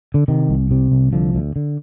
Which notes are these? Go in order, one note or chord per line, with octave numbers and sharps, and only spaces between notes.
D3
C3 D#3
C2
C3
C2
D3 F3
D2
D3